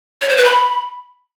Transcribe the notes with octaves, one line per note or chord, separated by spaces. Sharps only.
C#5
C5
B4
B5